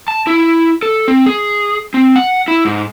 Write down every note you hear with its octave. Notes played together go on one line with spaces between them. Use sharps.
A5
E4
A4
C4
G#4
C4
F#5
E4
G#2